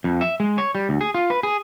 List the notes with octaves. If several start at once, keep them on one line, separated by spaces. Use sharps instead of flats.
F2
E5
G#3
C#5
G3
D2
G#4
F4
B4
G#4